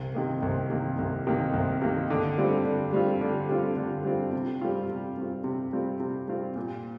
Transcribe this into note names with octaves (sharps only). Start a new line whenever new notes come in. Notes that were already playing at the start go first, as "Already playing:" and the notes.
Already playing: C2
C3 D#3 A#3
C2
C3 D#3 A#3
C2
C3 D#3 A#3
C2
C3 D#3 A#3
D3
G3 C4 F4
D3
G3 C4 F4
D3
G3 C4 F4
D3
G3 C4 F4
C3
G3 C4 F4
C3
G3 C4 F4
C3
G3 C4 F4
C3
G3 C4 F4
A#2